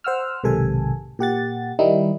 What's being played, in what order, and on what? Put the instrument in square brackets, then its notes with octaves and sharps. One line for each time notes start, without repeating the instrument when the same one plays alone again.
[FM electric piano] C5 F#5 E6 F6
B1 G#2 C3 D#3 A4 G#5
A#2 G4 F#5 A6
D#3 G3 D#4 E4